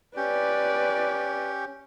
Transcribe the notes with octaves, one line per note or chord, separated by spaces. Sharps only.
C#4 G4 B4 D5